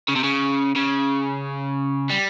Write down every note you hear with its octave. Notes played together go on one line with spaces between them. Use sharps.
C#3
C3
C#3
C#3
G3